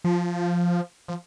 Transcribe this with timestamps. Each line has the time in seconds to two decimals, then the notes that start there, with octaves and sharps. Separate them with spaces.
0.04 F3
1.08 F3